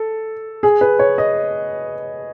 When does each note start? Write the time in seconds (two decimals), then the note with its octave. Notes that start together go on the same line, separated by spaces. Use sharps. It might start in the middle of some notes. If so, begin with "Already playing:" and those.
Already playing: A4
0.63 G#4
0.81 B4
0.99 C#5
1.18 D#5